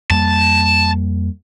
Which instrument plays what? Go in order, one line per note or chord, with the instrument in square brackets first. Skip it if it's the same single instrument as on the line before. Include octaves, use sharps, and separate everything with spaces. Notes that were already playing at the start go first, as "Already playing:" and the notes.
[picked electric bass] F2 G3 A#3 [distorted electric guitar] A5